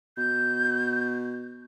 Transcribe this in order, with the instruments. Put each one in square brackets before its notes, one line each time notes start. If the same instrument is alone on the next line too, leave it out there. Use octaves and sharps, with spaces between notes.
[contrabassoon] B2 [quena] G6